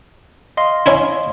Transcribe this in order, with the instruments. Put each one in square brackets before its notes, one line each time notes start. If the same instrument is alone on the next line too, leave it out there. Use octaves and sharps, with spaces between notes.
[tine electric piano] D#5 F5 C6
[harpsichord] C#4 D#4 E4